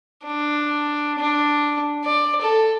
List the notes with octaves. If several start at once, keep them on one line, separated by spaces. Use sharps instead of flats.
D4
D4
D5
A4